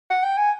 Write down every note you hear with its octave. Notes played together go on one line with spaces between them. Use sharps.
F#5
G5
G#5